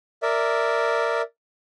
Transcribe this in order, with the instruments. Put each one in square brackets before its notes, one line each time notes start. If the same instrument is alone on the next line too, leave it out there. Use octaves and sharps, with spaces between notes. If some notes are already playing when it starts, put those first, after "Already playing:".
[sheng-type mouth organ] A#4 D5 E5